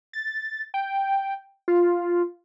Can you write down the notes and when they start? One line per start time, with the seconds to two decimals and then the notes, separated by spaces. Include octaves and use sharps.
0.13 A6
0.74 G5
1.68 F4